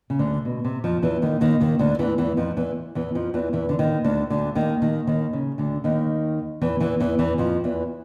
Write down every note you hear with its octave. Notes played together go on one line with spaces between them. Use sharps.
C#3
D2 D3
B2
C3
F2 F3
E2 E3
D#2 D#3
D#2 D#3
D#2 D#3
D2 D3
E2 E3
E2 E3
F2 F3
E2 E3
E2 E3
F2 F3
E2 E3
E2 E3
D3
D#2 D#3
D2 D3
D2 D3
D#2 D#3
D#2 D#3
D#2 D#3
C#3
D2 D3
D#2 D#3
E2 E3
E2 E3
E2 E3
E2 E3
F2 F3
E2 E3